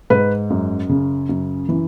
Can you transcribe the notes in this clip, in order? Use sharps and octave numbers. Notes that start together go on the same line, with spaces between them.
G#2 B4
F#2
C#3
F#2
E3